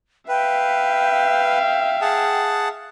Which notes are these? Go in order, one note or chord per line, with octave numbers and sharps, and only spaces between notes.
B4 E5 F5 G5
G#4 F#5 A5